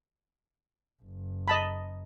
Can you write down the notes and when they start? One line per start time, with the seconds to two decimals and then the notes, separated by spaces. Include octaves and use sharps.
1.03 F#1
1.48 D#5 A5 B5